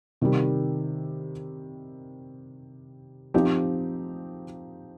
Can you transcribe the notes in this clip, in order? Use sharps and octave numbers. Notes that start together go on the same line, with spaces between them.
C3 D#3 G3
F3 C4 D#4 G4